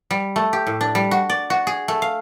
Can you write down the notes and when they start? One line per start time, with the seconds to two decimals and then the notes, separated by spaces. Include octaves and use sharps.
0.11 G3
0.36 A3
0.53 G4
0.67 A2
0.81 D4
0.95 G3
1.11 F#4
1.30 D5
1.50 F#4
1.67 G#4
1.88 A3
2.02 F5